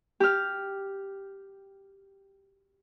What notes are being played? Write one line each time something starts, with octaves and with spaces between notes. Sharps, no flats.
G4 F6